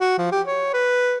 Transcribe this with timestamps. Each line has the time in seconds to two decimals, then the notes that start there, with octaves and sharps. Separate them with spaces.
0.01 F#4
0.18 F3
0.32 G4
0.47 C#5
0.74 B4